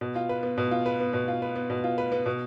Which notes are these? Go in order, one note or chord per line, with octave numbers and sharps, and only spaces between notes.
B2
F4
B4
B3
B2
F4
B4
B3
B2
F4
B4
B3
B2
F4
B4
B3
B2